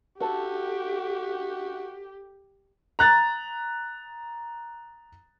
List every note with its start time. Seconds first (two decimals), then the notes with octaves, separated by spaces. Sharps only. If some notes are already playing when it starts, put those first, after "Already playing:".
0.21 F#4 G4 A4
2.99 A#5 F#6 A6